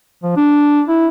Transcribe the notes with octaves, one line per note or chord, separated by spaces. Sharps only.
F3
D4
E4